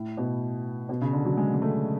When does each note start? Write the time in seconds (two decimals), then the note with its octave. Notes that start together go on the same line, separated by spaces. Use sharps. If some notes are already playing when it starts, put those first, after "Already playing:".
Already playing: A2
0.17 B2
0.89 B2
1.01 C#3
1.13 D3
1.25 F#3
1.37 G#3
1.54 G#3
1.62 A3